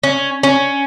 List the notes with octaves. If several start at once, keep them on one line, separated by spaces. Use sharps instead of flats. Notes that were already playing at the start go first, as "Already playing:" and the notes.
C#4
C#4